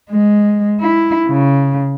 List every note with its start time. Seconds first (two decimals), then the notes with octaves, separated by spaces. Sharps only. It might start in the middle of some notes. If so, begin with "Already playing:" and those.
0.11 G#3
0.81 E4
1.28 C#3